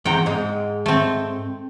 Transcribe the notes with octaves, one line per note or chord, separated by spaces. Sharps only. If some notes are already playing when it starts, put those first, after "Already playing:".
E2 C4 F#5 G5 A#5
G#2 G#3
A3 C4